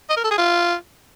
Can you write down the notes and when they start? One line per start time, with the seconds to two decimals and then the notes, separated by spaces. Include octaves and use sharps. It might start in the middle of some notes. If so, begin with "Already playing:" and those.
0.10 D#5
0.17 A#4
0.24 A4
0.31 G#4
0.38 F4